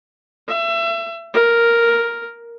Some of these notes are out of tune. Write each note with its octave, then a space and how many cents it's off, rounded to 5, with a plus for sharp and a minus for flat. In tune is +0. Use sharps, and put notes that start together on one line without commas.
E5 +30
A#4 +0